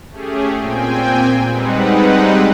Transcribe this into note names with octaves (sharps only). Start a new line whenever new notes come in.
A3 C#4 G4 G#4
A#2 C4 G5 G#5
G3 G#3 C4 D#4 B4 F#5